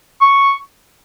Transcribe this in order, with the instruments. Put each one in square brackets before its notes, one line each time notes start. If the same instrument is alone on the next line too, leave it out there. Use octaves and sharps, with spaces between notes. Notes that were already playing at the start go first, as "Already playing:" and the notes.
[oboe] C#6